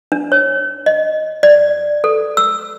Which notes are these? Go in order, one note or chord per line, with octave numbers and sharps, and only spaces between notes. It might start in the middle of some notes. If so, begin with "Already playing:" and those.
D4
C#5
D#5
D5
A4
E6